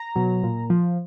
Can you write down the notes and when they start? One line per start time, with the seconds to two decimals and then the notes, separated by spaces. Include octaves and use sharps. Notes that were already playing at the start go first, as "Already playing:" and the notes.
Already playing: A#5
0.16 B2 F#3
0.43 A#2
0.70 F3